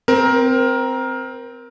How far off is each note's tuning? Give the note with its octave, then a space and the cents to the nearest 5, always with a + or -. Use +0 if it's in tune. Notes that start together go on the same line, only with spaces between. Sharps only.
C4 -10 A#4 +15